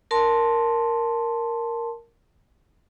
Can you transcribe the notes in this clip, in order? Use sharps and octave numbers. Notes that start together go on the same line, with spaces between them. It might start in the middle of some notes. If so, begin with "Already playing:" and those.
A#4 A5 C6